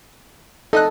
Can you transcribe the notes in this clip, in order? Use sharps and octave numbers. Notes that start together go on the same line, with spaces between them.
D#4 A4 D#5 F#6